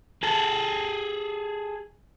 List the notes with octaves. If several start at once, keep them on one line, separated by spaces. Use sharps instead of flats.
G#4 A4